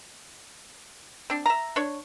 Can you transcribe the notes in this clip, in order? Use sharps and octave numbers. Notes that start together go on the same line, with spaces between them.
C4 D4
E5 A#5
D4 C#5